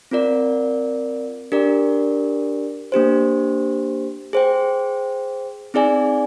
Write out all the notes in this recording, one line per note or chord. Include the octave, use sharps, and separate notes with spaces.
C4 F4 A#4 D5
D4 G4 A#4 D5
A#3 D4 G4 C5
G#4 C5 G5
C4 D#4 G#4 D5 G#5